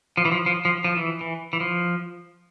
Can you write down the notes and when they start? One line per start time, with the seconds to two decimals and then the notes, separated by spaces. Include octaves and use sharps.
0.17 F3
0.25 E3
0.32 F3
0.46 F3
0.65 F3
0.84 F3
0.96 E3
1.21 E3
1.53 E3
1.60 F3